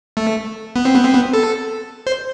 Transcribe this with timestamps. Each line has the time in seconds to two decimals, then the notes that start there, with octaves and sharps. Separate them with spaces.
0.17 A3
0.76 B3
0.85 C4
0.95 B3
1.04 C4
1.14 B3
1.33 A4
2.07 C5